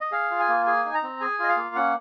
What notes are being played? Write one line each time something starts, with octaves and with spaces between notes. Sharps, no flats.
D#5
G#4 F5
F4
G#5
A#3
G#4 G#5
D#4
A#5
C4
G#4 G#5
F4 D#5
F5
A#3
C#4 F#5